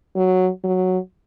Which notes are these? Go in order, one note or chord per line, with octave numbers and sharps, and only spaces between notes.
F#3
F#3